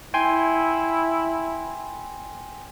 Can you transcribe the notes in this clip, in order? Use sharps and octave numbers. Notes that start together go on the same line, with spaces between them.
E4 G5 G#5 C6